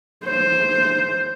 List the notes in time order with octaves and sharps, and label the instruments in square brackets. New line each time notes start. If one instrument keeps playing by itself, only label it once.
[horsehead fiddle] C5